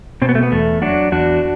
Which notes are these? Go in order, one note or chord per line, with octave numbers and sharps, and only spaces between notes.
B2 C4
B3
A3
B3
E2 A3
F#3 D4 F#4
E2 D4 F#4